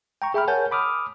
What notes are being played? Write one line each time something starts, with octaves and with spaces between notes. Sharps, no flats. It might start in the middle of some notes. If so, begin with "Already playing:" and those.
G5 A#5 C#6
G#4 E5 G5 B5 F6
A#4 C#5 F#5 G#5 A5 G6
B5 D6 D#6 F6